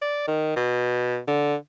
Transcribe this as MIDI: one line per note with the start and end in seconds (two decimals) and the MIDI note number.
0.02 0.25 74
0.28 0.55 51
0.56 1.18 47
1.28 1.55 50